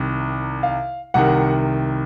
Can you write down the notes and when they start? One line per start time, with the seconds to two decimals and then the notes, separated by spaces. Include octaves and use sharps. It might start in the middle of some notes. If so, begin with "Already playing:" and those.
Already playing: C2 C3 D#3
0.63 F5
1.14 C2 C3 D#3 F#5